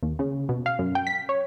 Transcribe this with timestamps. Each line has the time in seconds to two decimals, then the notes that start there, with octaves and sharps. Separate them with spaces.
0.03 D#2
0.19 C#3
0.49 B2
0.66 F5
0.79 F#2
0.95 G5
1.07 B6
1.29 C#5